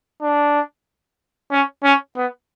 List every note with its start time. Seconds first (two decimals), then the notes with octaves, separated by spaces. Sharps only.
0.21 D4
1.52 C#4
1.84 C#4
2.16 B3